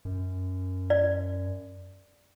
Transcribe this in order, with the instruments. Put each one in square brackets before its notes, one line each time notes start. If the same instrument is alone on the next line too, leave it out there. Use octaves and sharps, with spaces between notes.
[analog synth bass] F#2
[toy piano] D5